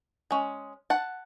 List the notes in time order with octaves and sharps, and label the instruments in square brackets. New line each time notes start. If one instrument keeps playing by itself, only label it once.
[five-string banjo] G#3 C#4
F#5 A5